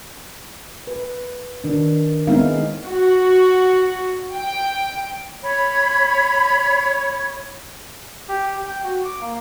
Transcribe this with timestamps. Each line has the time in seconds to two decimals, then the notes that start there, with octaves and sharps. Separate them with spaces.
0.87 B4
1.64 D#3 D4
2.27 G#3 B3 C4 D#4 E4 F5
2.85 F#4
4.33 G5
5.43 C#5 B5
8.29 G4
8.66 G5
8.84 F#4
9.05 D6
9.21 A#3